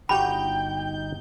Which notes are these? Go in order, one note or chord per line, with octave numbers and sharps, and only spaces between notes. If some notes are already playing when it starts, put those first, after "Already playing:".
G1 D#4 F#4 G4 F#5 G5 B5 G6